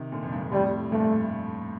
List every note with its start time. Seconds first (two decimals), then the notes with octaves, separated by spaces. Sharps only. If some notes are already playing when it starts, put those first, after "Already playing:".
Already playing: C3 D#3
0.12 A#2 D3
0.23 F2
0.32 G2
0.43 G2
0.52 F2 A2 G3
0.92 G2 A#2 A3